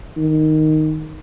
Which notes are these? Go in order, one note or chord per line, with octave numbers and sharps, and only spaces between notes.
D#3